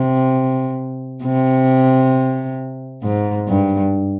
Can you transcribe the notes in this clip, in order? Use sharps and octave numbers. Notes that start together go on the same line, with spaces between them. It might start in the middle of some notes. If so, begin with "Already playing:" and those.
Already playing: C3
C3
G#2
G2